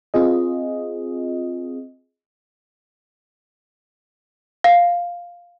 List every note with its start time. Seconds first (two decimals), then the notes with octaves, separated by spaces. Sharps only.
0.14 C4 F4 G#4 D#5
4.64 F5